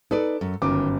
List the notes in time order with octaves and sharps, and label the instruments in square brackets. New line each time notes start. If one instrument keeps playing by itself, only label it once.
[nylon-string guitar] D#4 B4 D5 [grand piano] A4
[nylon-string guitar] F#2
[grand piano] G1 F#2 D6 [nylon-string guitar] D#3